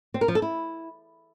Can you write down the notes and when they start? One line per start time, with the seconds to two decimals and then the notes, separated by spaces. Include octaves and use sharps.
0.14 C4
0.21 A#4
0.28 F3
0.35 A4
0.42 E4